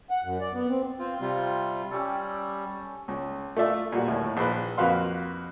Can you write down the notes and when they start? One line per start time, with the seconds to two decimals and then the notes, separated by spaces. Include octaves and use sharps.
0.10 F#5
0.24 F#2
0.40 D5
0.54 B3
0.69 C4
0.99 C4 F4
1.21 C3 G3 F4 G5 C6
1.91 G3 C#4 G4 A4
3.08 C#2
3.56 A3 F4 D5 E5
3.92 A#2 G3 F#4
4.08 D#2 A2
4.37 A#1 B4
4.77 F2 A#3 F#4 B4 F5 C6